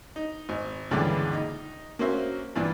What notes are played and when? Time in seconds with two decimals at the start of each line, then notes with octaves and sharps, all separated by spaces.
0.16 D#4
0.49 G#1
0.91 C#2 G2 A#2 D3 E3 G#3
1.33 D#4
1.99 A#3 C#4 F#4 C5 E5
2.56 G2 A#2 E3 D4